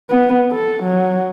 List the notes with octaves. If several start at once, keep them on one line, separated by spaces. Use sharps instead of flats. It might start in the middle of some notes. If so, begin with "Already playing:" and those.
B3
A4
F#3